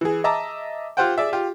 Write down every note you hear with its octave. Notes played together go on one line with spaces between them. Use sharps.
E3 G#4
D#5 E5 A5 A#5 D6
F4 G4 C5 F#5 G5
G#4 D5 E5
F4 G4